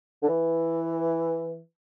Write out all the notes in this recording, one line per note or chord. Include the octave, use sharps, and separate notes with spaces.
D3
E3